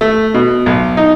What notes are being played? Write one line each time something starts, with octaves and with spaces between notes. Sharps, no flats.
A3
B2
B1
D#4